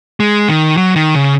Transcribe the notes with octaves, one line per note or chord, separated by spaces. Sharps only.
G#3
D#3
F#3
D#3
C#3